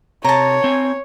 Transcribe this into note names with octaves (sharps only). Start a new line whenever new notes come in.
C3 C#5 A5 A#5
C4 G#5